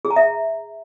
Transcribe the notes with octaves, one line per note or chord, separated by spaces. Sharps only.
G#4
A#5
E5